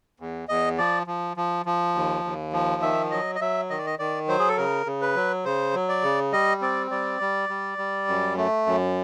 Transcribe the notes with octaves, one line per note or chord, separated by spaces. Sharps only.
E2
E2 D#5
F3 D5
F3
F3
F3
D#2
D#2
F3
D#3 E5
F#3 D#5
D#5
F#3 E5
D#3 D#5
D5
D#5
D#3 D5
F#3 C5
G#4
A4
C#3 A#4
C#3
B4
F#3
C#3 C5
F#3
D5
C#3
G3 D#5
C4 D5
G3 D5
G3
G3
G3
F#2
A3
F#2